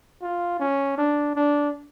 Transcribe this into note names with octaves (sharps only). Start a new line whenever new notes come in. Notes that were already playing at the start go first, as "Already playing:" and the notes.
F4
C#4
D4
D4